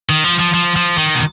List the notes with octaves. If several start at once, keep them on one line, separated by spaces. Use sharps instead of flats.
D#3
F3
F3
F3
F3
D#3
B2